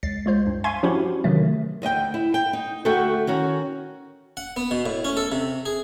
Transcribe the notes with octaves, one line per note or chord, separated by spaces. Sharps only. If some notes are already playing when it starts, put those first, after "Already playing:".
C#2 A6 C7
G#3 F4 C5
G2
E5 F5 G#5 C6 C#6 G#6
F3 C#4 D4 E4 F#4 G4
C3 D#3 E3 F#3 A3
D2 D#5 E5 G5
E4
G5
D#4
D2 A3 F#4 A4 E5 G5
D#3 C#4 F#4
F#5
B3
B2
A2
C#4
A4
C3
G#4